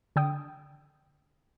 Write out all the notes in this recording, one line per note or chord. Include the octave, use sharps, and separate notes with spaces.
D3 D4 G5 D#6